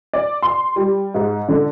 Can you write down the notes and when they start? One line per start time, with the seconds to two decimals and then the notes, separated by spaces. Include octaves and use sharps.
0.13 D5
0.42 C6
0.76 G3
1.14 G#2
1.49 D3